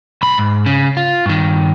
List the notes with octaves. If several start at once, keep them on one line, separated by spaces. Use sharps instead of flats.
B1 B5
G#2
C#3
F4
G2 D#3